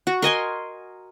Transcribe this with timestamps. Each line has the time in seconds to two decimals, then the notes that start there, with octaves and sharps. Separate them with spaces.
0.07 F#4
0.22 A#4 D#5 G#5 C6